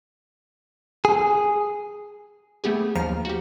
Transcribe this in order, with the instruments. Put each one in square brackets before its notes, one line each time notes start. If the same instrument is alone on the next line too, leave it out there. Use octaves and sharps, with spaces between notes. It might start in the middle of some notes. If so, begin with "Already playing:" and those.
[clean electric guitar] G#4
[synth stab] A3 B3 G4 G#4
D#2 F3 A#5 F6
F#4 G4